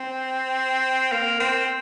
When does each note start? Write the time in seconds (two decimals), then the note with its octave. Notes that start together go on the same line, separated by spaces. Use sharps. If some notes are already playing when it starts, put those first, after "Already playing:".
Already playing: C4
1.13 A#3
1.40 C4